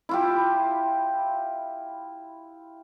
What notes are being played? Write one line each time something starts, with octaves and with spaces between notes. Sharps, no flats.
E4 F4 G4